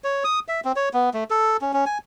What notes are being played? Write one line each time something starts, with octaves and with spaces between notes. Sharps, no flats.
C#5
D#6
E5
C4
C#5
B3
A3
A4
C#4
C#4
G#5